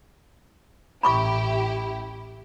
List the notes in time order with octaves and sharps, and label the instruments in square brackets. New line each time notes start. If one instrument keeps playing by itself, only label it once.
[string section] A1 E4 G4 [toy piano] B5 C#6 D6